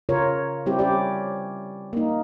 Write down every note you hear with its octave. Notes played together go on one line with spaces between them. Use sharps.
C#3 F4 A#4 C#5
G3 C4 E4 G4
C#4 G4 D5
A#3 D#4